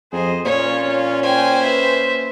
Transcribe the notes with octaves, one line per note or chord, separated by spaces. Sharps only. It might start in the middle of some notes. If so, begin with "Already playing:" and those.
F2 G#4 C5 D#5
A#2 A#3 C#4 F4 C#5
C5 G5 G#5
B4 E5